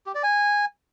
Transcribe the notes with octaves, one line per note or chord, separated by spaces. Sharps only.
G4
D5
G#5